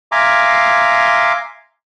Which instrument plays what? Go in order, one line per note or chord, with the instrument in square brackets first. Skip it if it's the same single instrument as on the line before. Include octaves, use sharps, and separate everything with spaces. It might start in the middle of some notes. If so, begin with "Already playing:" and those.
[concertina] E5 F5 G#5 A#5 C6 D6